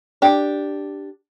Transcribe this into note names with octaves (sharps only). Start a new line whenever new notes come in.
D4 G4